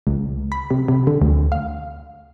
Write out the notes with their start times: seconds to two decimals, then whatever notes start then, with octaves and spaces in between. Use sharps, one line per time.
0.07 C#2
0.52 B5
0.71 C3
0.88 C3
1.07 D3
1.22 D2
1.52 F5